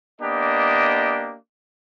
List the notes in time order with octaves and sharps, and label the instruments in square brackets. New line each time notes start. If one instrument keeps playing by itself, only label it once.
[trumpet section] A#3 B3 D4 G4 D#5